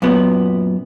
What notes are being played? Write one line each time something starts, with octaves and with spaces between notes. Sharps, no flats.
F#2 A#2 B3